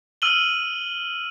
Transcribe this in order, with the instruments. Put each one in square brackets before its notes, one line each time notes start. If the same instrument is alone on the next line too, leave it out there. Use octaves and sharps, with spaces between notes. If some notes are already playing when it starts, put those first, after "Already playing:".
[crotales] E6 F6 D#7 F#7 G7